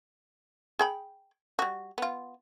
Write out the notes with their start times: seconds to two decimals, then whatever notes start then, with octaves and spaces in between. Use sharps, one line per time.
0.79 G#4 G5 B5
1.59 G3 F#4
1.98 B3 F4